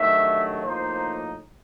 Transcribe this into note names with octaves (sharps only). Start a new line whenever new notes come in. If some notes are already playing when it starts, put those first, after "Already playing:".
Already playing: G2 D#3 F#3 A3 E5
A2 F3 A#3 D#4 C5